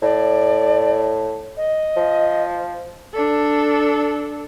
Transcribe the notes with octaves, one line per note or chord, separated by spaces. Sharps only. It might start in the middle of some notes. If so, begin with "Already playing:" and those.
A2 D5
D#5
F3
D4 A4